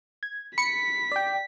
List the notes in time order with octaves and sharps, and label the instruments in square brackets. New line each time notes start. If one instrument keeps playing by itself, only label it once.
[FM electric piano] G#6
[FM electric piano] B5 [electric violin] B6 [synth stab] C#7
[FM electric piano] D5 G5